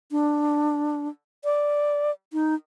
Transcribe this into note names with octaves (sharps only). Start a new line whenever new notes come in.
D4
D5
D#4